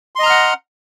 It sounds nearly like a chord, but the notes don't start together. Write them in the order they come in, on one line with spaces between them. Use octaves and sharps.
C6 D#5 A#5 F6 F#5